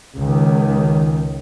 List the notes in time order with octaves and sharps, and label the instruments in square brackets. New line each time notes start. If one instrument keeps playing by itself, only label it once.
[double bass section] C#2 D#3